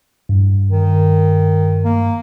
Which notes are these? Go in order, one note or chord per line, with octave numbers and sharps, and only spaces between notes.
G2
D#3
A#3